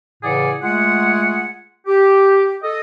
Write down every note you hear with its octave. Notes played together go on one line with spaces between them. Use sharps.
A2 C#3 E3 G#4 D5 F#5
G#3 A3 F4 G#4 F#5
G4
A4 D#5